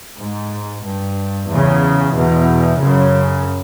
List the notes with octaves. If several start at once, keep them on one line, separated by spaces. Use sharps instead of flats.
G#2
G2
E2 C#3
E2 B2
F#2 C#3